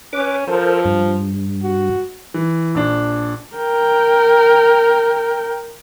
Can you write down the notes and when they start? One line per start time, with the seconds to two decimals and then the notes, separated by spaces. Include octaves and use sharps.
0.13 C#4 B4 D6
0.47 F3 A4 A#4 C5
0.85 G2
1.62 F#4
2.34 E3
2.75 A#1 D4
3.56 A#4 G5